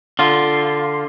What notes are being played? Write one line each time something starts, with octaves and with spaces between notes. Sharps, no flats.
D3 F4